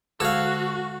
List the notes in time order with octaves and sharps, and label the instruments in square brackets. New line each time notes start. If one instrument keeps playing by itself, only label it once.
[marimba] D3 G#3 [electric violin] F#4 [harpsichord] A4 F5